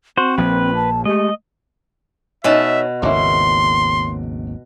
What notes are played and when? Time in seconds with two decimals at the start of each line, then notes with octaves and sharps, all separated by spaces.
0.17 C4 F#4 C5
0.38 A#1 F3 A#3 B4
0.75 A5
1.05 G#3 A3 G4 D#5
2.44 B2 C#4 D#4 E5 A5
3.02 G#1 D#2 C#3 A#3 C#4 E4 C6